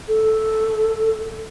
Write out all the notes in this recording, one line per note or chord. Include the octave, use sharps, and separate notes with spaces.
A4